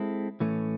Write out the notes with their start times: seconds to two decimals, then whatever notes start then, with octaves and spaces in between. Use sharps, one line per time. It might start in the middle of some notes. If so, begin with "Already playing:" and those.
Already playing: G#3 C4 E4 A4
0.40 A2 E3 A3 C#4